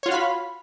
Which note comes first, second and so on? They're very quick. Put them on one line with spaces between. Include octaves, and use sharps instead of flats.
C#5 F4 F#4 F5 B5